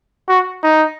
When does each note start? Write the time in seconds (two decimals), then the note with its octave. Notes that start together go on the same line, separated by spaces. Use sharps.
0.29 F#4
0.63 D#4